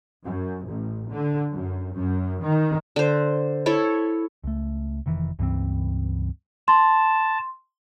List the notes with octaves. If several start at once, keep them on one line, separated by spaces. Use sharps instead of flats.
F#2
A1
D3
F#2
F#2
D#3
D3 C5
E4 A4 C#5
C#2 A3
F1 D#3 E3
C#2 G2 E3 C4
A5 C6